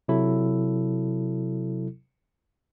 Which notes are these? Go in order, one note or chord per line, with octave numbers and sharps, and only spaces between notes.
C3 F#3 E4 A4